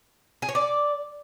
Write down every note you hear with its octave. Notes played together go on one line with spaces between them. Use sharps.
G#4
C#5
D5